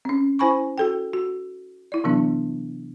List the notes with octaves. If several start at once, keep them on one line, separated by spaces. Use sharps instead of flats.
C4 C#4
E4 C5 G#5 B5 C#6
F#4 A4 G5
F#4
E4 D5
C3 E3 F#3 B3 D4